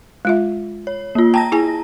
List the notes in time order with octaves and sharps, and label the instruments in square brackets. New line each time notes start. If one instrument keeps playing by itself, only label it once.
[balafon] G#3 F4 E5
[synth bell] C#5
A#3 F4
[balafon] G5 [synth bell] A5 A#5 A#6
[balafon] E4 G#4 G#5